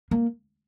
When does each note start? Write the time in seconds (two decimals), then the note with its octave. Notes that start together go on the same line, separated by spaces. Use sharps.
0.11 A#3